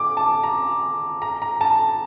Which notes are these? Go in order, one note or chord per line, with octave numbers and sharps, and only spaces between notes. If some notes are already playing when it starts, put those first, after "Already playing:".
Already playing: D6
A5
A#5
A#5
A#5
A5